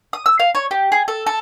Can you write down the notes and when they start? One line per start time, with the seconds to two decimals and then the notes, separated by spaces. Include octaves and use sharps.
0.13 D#6
0.26 E6
0.40 F5
0.55 C#5
0.71 G4
0.92 G#4
1.08 A4
1.27 A4